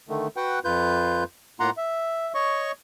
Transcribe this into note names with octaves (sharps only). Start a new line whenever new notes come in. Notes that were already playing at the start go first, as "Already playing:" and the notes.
D3 D#3 A3
F#4 B4 F#5 G5
F2 F4 B4 G6
A2 A#3 F4 F#5 A#5 C6
E5
C#5 D#5 C#6